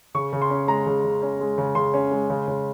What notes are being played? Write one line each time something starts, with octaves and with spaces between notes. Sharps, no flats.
C#3 C#6
C#3
C6
C#4
G#3 A#5
C#3
C#3
C#4
G#3
C#3
C#3 C6
C#4
G#3
C#3
C#3